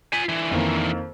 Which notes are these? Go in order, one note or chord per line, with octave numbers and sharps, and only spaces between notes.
F4 G#5 B6
D3 E3
F2 D#3 A#3